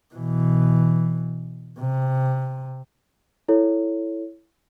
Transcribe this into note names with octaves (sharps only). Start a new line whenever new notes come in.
B2 E3
C3
E4 A4 C#5